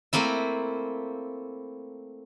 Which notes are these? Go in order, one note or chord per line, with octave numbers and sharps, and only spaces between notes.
A3 A#3 C4 E4